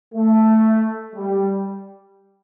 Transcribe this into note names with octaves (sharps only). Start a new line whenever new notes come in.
A3
G3